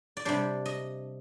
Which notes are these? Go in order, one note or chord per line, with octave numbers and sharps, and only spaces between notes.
D5
C3 G3 D4 C5
D#5